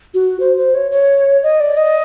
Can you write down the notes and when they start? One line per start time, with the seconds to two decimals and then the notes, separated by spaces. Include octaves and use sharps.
0.14 F#4
0.40 C5
0.57 C5
0.74 C#5
0.91 C#5
1.43 D#5
1.60 D5
1.77 D#5